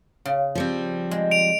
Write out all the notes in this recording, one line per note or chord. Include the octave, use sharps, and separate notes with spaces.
C#3
F3 G3 C4
G#3
D7 F7